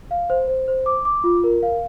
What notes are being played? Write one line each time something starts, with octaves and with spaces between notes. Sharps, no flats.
F5
C5
C5
C5
D6
D6
F4
A#4
F5